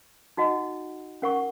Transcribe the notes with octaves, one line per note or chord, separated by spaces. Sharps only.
D#4 F#4 D#5 F#5
C#4 A#4 F#5 C#6